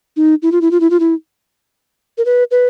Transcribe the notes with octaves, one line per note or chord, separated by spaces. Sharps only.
D#4
E4
F4
E4
F4
E4
F4
E4
A#4
B4
B4